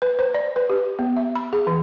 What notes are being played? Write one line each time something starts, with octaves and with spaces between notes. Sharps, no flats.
B4
C5
D5
B4
G4
B3
E5
B5
G#4
E3